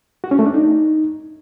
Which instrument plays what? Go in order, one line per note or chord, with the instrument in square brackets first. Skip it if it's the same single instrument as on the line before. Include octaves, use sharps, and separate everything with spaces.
[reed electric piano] F#4
C#4
A3
D4
D#4